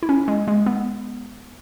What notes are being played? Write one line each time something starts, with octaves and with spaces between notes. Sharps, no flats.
E4
C#4
G#3
G#3
B3